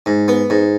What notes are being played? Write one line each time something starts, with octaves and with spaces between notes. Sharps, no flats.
G#2
B3
G#2